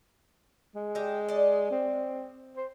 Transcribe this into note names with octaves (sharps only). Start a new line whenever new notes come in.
G#3
G4 D#5 E5
D5 D#5
C4
C5